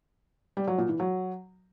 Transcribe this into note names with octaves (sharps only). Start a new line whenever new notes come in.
G3
F#3
A#2
E3
F#3